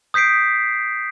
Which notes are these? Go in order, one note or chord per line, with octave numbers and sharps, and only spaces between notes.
D#6 G6 B6 C7 D7